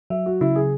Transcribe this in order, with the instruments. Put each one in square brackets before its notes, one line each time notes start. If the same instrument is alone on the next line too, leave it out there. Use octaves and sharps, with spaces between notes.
[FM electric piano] F#3 [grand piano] E5
[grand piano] F#4
[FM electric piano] C#3 [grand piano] E4
[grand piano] G#4